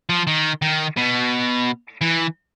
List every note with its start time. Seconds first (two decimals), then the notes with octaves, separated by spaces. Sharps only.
0.09 F3
0.27 D#3
0.62 D#3
0.97 B2
2.01 E3